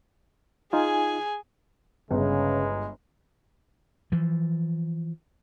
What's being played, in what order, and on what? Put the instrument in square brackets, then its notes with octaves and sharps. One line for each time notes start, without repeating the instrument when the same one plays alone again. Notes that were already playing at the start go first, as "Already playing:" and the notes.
[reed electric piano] D#4 F4 [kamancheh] G#4 G#5
[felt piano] G1 [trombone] C#3 [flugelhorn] G#3
[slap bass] E3 F3